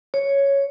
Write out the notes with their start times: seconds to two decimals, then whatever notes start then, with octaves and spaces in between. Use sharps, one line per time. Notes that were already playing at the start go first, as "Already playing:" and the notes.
0.14 C#5